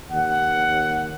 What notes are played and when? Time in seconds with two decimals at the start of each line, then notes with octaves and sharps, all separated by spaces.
0.11 D#2 F#5